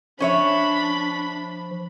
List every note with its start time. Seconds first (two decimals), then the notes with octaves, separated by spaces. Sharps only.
0.20 F3 C#4 D4 C#5 E5 B5